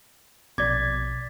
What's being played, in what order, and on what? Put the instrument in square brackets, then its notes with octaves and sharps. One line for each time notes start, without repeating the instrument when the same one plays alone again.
[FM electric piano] A#1 B2 [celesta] D5 G#6 [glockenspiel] D6 A6 B6